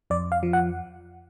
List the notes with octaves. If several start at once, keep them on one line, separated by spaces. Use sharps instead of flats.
F2 D5
F5
F3
F#5